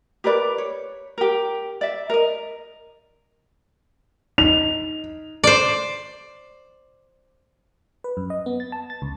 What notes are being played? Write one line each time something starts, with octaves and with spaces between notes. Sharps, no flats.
G4 A#4 B4 D5
C#5
G4 A#4
D5 E5
A#4 D#5
D#4 F7
C5 D5
B4
F#2
D#5
B3
A6
A5
A6
C#2